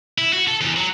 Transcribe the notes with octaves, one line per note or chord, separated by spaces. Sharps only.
E4
F#4
A4
E2
F#3